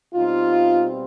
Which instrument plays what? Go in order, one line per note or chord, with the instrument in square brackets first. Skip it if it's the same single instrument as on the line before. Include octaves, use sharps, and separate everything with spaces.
[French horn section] B2 G3 C4 D#4 F4